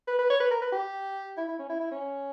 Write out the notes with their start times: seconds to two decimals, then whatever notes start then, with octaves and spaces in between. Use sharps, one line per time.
0.07 B4
0.19 B4
0.30 C#5
0.40 B4
0.51 A#4
0.62 B4
0.72 G4
1.37 E4
1.48 E4
1.59 C#4
1.69 E4
1.80 E4
1.91 C#4